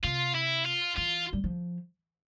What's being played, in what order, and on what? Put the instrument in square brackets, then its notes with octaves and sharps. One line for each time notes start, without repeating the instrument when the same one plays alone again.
[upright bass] C3 [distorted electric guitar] F4
[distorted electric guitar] E4
F4
[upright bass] E3 [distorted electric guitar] F4
[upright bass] G3
F3